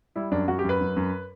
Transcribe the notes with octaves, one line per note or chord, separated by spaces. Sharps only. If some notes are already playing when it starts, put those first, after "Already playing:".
G3 E4
F#2 D4
F#2 F#4
G4
F#2
B4
F#2
F#2